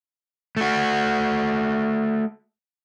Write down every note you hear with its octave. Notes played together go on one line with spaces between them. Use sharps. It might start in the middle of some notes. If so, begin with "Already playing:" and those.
A3 F#4